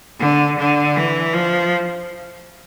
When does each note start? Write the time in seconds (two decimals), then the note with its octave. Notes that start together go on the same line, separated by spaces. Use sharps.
0.19 D3
0.58 D3
0.96 E3
1.34 F3